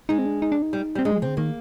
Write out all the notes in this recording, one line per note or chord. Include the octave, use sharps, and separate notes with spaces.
G#3 D#4
C4
D4
D#4
D4
D#4
G3
G3
C4
G#3 D4
G3
F3
C3 D3 C4
D#3 A#3